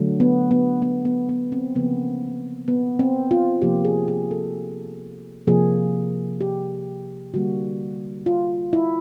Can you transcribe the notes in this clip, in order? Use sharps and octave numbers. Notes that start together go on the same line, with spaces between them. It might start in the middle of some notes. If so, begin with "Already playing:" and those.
Already playing: D3 F#3 A3
B3
B3
B3
B3
B3
C4
C#3 F3 A#3 B3
B3
C4
F4
C3 F3 A#3 G4
G#4
G#4
A4
C3 F3 A#3 G#4
G4
D3 G3 A#3 F#4
F4
E4